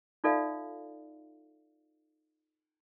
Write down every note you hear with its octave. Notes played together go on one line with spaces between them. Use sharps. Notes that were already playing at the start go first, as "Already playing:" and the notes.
D#4 F4 A4 D5 E5 F5